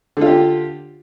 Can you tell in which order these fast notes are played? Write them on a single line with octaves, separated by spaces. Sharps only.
D3 F4 G4